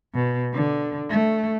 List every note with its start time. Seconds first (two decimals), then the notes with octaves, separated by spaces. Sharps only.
0.14 B2
0.53 D3
1.10 A3